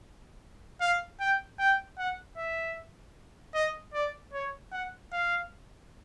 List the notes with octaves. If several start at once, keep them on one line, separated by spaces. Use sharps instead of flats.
F5
G5
G5
F#5
E5
D#5
D5
C#5
F#5
F5